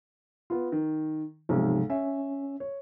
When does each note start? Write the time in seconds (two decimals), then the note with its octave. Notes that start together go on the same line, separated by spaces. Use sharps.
0.50 B3 F4
0.72 D#3
1.49 B1 G#2 C3 F3
1.90 C#4 E5
2.60 C#5